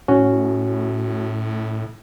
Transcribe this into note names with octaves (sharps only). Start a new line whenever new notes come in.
A2 C#4 F#4